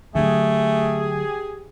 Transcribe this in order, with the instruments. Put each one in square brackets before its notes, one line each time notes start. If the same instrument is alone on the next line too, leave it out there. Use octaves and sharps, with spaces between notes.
[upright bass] D3 F#3 [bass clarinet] A3 [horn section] G4 G#4